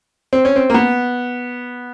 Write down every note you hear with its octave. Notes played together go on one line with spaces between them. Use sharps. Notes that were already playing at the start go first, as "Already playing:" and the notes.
C4
C#4
C4
A#3
B3